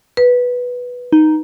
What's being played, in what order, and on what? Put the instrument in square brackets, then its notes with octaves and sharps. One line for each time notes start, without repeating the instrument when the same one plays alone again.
[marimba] B4
[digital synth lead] D#4